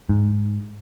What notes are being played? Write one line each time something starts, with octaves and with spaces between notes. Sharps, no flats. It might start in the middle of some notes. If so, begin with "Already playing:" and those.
G#2